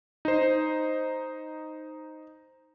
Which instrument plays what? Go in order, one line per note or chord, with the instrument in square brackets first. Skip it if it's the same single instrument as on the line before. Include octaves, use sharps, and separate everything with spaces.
[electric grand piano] D#4 C5